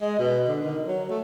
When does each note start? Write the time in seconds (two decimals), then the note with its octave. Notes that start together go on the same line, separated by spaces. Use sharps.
0.01 G#3
0.19 B2
0.48 D3
0.63 D#3
0.87 F#3
1.10 A3